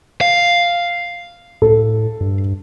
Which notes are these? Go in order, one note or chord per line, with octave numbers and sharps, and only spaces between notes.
F5
A2 A4
G2